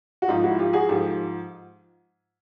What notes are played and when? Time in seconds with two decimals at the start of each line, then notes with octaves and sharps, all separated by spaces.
0.22 F#4
0.28 G#2 F3 D#4 F4
0.43 E4 F#4
0.59 F4 G4
0.73 F#4 G#4
0.89 G#2 F3 G4 A4